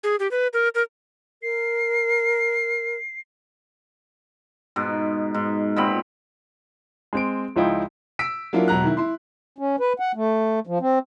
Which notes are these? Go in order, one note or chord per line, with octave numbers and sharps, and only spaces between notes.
G#4
G4
B4
A#4
A#4
A#4 C7
G#2 B2
G#2
A#2 B3 C4 B5
G#3 C4 D7
C#2 F3 D#4 E4 G5
E6 B6 D7
F#3 A#3 D4 E4 F4
E1 F#3 A#5 F#6
D#3 E4
E4 C6
C#4
B4
F#5
A3
F3
C4